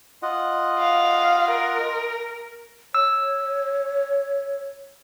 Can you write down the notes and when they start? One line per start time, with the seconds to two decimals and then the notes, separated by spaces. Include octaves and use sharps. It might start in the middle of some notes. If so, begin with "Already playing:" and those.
0.22 F4 D#5 F#5
0.79 F5
1.51 A#4
2.95 C#5 E6